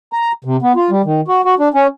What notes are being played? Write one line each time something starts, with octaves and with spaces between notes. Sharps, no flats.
A#5
C3
B3
F4
G3
D#3
F#4
F#4
D4
C#4